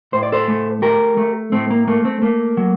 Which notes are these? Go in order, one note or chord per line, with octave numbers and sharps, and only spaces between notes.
A2 C5
D5
A4 C5
A3
A3 G4 A#4
A3
A2 A3 C4
A#3
A3 A#3
A3 C4
A3 A#3
F#3